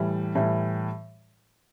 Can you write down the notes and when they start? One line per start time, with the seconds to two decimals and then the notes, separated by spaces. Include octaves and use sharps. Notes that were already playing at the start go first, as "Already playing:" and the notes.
Already playing: A2 E3 G3
0.35 A2 E3 G3